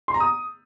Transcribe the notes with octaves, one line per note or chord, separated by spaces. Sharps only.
C6
A#5
D#6